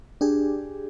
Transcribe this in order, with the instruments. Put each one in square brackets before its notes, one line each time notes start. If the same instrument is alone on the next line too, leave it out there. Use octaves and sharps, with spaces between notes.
[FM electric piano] D4 G4 G#4